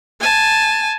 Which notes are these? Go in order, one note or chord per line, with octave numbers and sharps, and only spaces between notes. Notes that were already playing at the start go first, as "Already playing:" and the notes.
G#5 A5